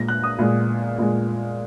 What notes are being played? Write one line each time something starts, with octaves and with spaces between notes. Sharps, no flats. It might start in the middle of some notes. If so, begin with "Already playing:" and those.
Already playing: A#2 G#3 A#6
F#6
D#6
A#2 G#3
A#2 G#3